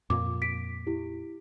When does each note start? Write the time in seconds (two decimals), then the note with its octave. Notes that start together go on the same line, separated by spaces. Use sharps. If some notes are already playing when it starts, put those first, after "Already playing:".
0.10 F2 A#2 A#3 D6
0.42 B6 D7
0.87 E4 G4